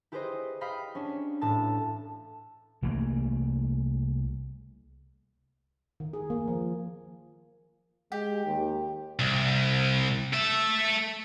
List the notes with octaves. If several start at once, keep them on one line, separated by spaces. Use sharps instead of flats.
E4 G4 G#4 B4 C5 D#5
D#5 F5 G5 B5
C#4 D4
A1 A2 A5 E6
C2 E3 A3 A#3
D#3
G#4
A#3
F3
G#3 G4
D#2
C2
A4 E5